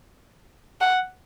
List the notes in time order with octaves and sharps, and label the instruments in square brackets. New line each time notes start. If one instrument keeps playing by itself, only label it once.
[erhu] F#5